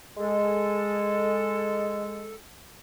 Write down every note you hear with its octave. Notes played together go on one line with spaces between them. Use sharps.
G#3 A4